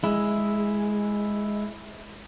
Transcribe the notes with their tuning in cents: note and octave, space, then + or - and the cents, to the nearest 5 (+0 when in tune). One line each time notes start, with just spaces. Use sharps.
G#3 +0 E4 +0